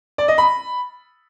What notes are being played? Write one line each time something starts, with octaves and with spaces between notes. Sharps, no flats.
D5
D#5
B5